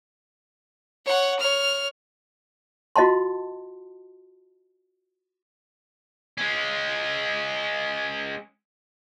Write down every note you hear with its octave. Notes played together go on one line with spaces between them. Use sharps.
C#5 F#5
C#5 F6
F4 F#4 D#5 F#5 A5 C6
G#3 C#4